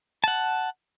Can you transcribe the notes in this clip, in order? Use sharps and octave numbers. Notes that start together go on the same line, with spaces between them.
F#5 A5